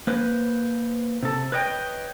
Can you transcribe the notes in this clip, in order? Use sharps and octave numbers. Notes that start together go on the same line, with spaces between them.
A#3 B4 C5
C3 A4
B4 C#5 D#5 F5 G5